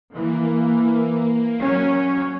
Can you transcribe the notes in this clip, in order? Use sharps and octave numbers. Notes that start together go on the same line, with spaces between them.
E3 A#3
F#3 C#4